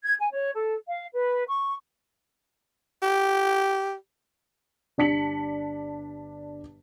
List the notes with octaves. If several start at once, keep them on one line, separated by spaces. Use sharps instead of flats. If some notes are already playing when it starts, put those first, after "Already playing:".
G#6
G#5
C#5
A4
F5
B4
C#6
G4
G1 D4 A5 B6 C#7 F#7